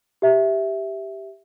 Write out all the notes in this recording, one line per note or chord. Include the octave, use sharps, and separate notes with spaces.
G4 E5